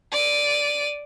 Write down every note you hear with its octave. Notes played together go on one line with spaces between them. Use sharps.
D5 D#7